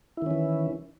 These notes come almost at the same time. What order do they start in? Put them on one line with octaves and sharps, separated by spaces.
E4 D#3 C#4 E3